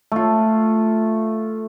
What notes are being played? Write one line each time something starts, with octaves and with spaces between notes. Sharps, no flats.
A3 F4